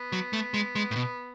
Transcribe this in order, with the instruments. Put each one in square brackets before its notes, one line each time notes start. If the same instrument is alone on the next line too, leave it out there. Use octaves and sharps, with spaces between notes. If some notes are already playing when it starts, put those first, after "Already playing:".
Already playing: [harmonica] B3
[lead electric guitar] F#3
A3
G#3
G#3
A2
B2